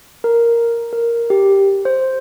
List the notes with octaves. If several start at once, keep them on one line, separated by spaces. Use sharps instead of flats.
A#4
A#4
G4
C5